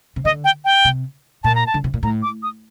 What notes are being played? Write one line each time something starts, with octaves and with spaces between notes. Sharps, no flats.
C3
D3 D#5
G5
G5
C3
A#2 A5
A#5
A5
D3
C3
A#2
A2 A#5
D6
D#6